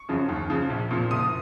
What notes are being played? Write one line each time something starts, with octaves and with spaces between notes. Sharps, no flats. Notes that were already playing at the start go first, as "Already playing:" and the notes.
Already playing: C#6
F#2 C#3 F3
D#2
C#3 F3
A#1
A#2 F3
F#1 D#6